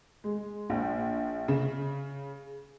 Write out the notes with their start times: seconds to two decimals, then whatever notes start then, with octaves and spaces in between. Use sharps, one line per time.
0.24 G#3
0.70 A#1
1.48 C#3